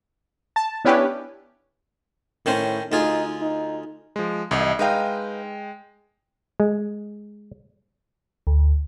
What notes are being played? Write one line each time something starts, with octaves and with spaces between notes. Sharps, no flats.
A5
B3 C#4 D4 E4 G4 B4
A2 D#3 C#4 C5
D2 D#4 F4 G#4
D#4
F3 G#3
C2 G#2 E3 D#5
G#3 D#4 B4 F5 G5
G#3
D2